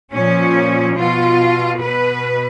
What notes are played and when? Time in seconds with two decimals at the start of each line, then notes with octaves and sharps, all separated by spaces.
0.12 A#2 F3 C#4
0.96 B2 F4
1.80 B2 B4